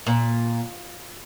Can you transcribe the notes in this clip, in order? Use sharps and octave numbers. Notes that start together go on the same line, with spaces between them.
A#2